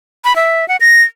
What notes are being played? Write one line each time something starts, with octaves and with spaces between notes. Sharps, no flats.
B5
E5
F#5
A#6